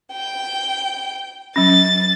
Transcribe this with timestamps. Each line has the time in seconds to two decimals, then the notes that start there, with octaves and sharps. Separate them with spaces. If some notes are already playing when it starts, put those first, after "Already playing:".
0.13 G5
1.56 F#3 C#4 A6